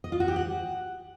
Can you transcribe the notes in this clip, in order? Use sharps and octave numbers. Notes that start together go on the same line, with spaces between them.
D#5
F4
F#4
G4
F#5